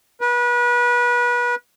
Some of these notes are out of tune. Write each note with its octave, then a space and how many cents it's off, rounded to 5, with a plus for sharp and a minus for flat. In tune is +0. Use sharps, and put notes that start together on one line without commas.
B4 -30